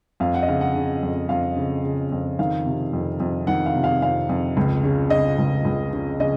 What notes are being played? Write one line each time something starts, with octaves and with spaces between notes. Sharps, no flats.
F2 F5
F#5
D#5
C#3 F5
F#5
C#3
F2
F2 F5
C#3
C#3
F2
D#3 F5
C3
F2
F2
D#3 F#5
F5
C3
F5
F2 F5
F2
C#2
C#3
C#3 D#5
C#2
C#2
C#3
C#3 D#5